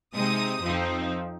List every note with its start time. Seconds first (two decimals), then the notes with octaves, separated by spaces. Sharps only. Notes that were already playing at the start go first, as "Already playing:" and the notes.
0.14 C3 G#3 C4 D#4 D#6
0.62 F2 F3 C4 D#4